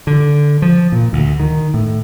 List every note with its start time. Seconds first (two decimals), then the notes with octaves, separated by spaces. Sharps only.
0.07 D3
0.62 F3
0.92 A#2
1.13 D2
1.40 D#3
1.74 A2